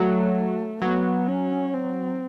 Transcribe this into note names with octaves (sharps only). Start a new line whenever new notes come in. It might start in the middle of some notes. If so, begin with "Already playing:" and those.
Already playing: F#3 A3
F#3 B3
C#4
C4